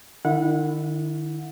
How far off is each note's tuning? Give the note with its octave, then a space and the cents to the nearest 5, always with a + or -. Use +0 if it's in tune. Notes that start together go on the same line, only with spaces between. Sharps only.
D#3 -40 E4 +0 F#5 -25